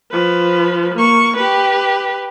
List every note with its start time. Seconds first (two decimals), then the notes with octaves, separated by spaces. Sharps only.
0.11 F3 B4
0.95 A#3 C#6
1.37 G4 B4